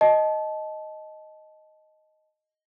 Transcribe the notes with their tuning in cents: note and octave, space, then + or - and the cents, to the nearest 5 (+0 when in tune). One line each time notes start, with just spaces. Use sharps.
D#5 +0 A5 -20